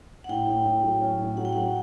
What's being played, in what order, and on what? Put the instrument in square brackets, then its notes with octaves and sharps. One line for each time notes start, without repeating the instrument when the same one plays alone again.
[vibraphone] F#5
[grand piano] A2 [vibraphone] G5
[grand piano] A2
A2
F#3
C#4
A2
[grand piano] F#3 [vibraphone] F#5
[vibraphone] G5
[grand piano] F#3 [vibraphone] F#5